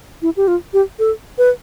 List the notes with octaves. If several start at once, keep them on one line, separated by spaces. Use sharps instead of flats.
E4
G4
F4
G4
A4
B4